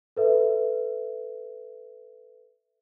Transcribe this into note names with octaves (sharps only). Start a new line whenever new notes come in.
A4 B4 E5